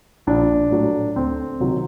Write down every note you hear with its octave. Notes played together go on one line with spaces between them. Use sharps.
A#1 D4
A2 F#3
D2 C4
C3 D#3 F#3